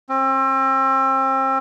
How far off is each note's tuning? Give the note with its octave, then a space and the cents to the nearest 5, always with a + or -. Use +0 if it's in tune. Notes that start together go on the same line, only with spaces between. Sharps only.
C4 +35